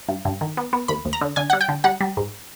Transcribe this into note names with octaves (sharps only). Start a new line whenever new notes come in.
G2
G2
D#3
B3
B3
D#2 B5
D#2
A#5
D3
D3 G#5
G3 F#5
G5
D3
G3 F#5
G3
G#2